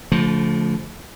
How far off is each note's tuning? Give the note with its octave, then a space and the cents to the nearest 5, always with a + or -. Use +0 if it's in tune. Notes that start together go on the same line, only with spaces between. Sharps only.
D3 -45 F3 +0 A3 +0